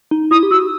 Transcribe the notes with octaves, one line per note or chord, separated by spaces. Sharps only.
D#4
E4 D#6
G4
F#4 E6